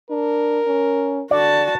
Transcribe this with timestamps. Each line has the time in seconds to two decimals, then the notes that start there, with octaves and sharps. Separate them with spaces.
0.11 D4 A#4
0.67 C#4
1.31 D3 F#4 D5 A5